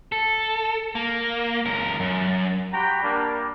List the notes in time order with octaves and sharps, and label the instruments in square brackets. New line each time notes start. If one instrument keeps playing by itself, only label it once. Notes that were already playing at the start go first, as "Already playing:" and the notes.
[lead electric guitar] A4
A#3
C#2 A#4
F#2
[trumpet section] F#4 G4 G5 A#5 B5
G3 A#3 D4